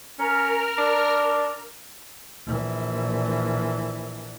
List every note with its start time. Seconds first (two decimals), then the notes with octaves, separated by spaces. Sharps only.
0.19 C#4 A#4 F6
0.78 D4
2.46 A#1 E3